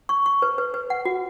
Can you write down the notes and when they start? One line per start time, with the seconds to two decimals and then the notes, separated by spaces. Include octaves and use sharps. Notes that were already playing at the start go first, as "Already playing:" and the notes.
0.09 C#6
0.26 C#6
0.42 B4
0.58 B4
0.74 B4
0.90 F#5
1.05 F#4